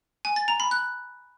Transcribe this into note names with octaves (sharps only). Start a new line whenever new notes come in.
G#5
A6
A#5
B5
F#6